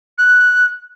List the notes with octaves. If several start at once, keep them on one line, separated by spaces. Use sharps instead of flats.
F#6